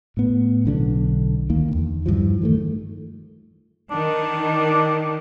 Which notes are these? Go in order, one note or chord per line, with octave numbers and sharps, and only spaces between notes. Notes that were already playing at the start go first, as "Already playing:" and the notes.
A2 B3
B1 D3 C#4 D4
D2 D#3 A#3
D#1 E2
G2 E3 F3
D#3 G#3 A3
D#3 D4